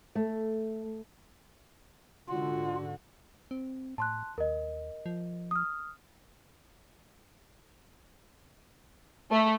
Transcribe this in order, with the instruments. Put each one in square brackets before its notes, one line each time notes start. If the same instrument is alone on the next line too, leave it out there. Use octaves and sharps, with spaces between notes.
[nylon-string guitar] A3
[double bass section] G#2 D3 [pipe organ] F4 [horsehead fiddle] F#4
[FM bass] C4
[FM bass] A2 [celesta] A5 C6 F#6
[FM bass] D#2 [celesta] A#4 D#5
[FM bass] F3
[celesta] D#6 F6
[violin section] A3